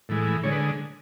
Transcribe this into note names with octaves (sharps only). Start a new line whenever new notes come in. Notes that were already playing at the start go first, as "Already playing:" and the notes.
A2 E3 G#3
D3 G#3 C#5
B4